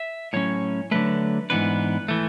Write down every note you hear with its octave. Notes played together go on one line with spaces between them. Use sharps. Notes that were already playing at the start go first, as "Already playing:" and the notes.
Already playing: E5
A2 F#3 C#4 C#5
D3 F#3 A3 B4
G#2 E3 B3 D4 B4
E3 A3